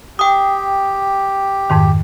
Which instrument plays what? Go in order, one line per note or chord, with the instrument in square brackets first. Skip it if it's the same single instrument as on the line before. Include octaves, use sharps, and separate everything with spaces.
[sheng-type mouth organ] G4 [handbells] G5 D#6
[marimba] F2 G#2 D#3